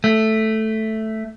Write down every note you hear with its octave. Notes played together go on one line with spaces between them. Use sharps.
A3